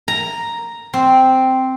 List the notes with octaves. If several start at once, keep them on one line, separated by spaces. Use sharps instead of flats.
A#5
C4